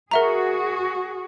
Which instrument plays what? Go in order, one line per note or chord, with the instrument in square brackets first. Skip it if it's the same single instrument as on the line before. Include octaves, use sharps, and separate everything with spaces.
[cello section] F#4 G#4 [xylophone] A#4 E5 A#5